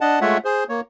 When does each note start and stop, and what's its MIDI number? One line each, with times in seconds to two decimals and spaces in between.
0.01 0.19 62
0.01 0.19 75
0.01 0.19 78
0.01 0.19 81
0.21 0.38 56
0.21 0.38 57
0.21 0.38 65
0.21 0.38 73
0.21 0.38 76
0.21 0.38 78
0.45 0.64 68
0.45 0.64 72
0.69 0.81 58
0.69 0.81 73